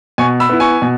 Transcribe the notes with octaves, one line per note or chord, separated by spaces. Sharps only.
B2 G#5 C#6
B5 E6
B3 E4
G#5 C#6
B2